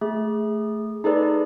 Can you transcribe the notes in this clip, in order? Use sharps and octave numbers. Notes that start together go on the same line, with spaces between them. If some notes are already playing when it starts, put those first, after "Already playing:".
A3 G#4
D#4 G#4 A4 B4 D5